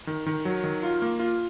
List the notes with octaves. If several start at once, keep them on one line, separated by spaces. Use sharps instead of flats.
D#3
D#3
F#3
D#3
F4
A#3
F4